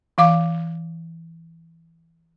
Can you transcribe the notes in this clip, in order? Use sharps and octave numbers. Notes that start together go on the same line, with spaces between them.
E3 F5 D6